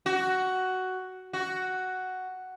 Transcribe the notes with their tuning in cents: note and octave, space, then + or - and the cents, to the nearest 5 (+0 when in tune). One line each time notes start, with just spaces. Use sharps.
F#4 +10
F#4 +5